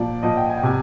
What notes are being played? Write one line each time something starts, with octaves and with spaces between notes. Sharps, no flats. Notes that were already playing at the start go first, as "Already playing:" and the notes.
Already playing: A#2 F3 D5
A#2 F3 D#5
G5
G#5
G5
C3 G#5